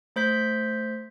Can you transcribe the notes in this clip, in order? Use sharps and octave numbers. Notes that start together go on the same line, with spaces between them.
A3 C5 G6 B6